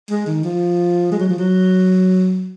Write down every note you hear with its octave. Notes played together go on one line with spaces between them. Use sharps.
G#3
D#3
F3
G#3
F#3
F3
F#3